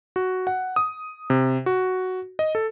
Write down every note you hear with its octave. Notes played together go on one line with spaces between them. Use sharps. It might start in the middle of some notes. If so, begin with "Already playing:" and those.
F#4
F#5
D#6
C3
F#4
D#5
A4